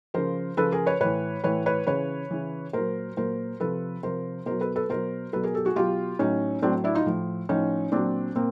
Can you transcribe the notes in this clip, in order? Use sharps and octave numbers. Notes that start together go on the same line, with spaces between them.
C#3 F3 A#4 C5
C#3 F3 A4 B4
G#4 A#4
B4 C#5
A2 E3 B4 C#5
A2 E3 B4 C#5
B4 C#5
C#3 E3 B4 C#5
C#3 E3
A#2 F#3 A#4 C5
A#2 F#3 A#4 C5
C3 F3 A4 B4
C3 F3 A#4 C5
B2 F#3 A#4 C5
A4 B4
A4 B4
B2 F#3 A#4 C5
B2 F#3 A4 B4
G#4 A#4
G4 A4
F#4 G#4
B2 F#3 F4 G4
A2 F#3 C#4 D#4
A2 F#3 C4 D4
D4 E4
D#4 F4
A2 F3
A2 F3 C#4 D#4
A#2 F#3 C4 D4
A#2 A#3 C4